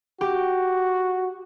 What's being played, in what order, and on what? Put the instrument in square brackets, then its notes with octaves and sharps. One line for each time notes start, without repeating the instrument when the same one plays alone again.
[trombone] F#4 [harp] G4